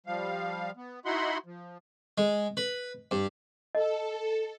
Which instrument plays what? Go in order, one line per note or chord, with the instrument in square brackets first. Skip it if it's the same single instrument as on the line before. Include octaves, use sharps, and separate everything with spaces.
[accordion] F3 G3 F5
B3
D#4 E4 F#4 F#5 B5 C6
F3
[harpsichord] G#3
B4
G2
[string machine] A4 [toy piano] D#5